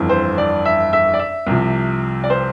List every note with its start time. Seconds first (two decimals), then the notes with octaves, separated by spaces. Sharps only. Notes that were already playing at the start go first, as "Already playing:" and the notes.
Already playing: G1 F2 E3
0.09 C5
0.38 D5
0.65 E5
0.93 E5
1.14 D5
1.19 E5
1.47 C2 C3 F3
2.24 D5
2.30 C5